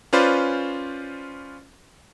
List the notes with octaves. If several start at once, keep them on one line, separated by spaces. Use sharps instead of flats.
C#4 F4 B4 C5 D5